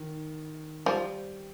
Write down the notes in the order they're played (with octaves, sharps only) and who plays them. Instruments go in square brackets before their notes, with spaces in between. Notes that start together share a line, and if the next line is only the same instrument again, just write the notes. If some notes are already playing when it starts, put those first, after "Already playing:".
Already playing: [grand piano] D#3
[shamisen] F3 [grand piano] G3